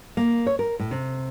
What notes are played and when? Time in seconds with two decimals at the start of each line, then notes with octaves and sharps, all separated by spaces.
0.17 A#3
0.47 C#5
0.59 A#4
0.80 A2
0.91 C3